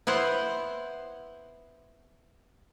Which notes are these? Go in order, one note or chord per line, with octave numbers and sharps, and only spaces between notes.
B3 E4 C5 F#5